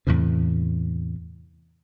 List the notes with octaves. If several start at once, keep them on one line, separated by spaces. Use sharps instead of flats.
E2 A2 C3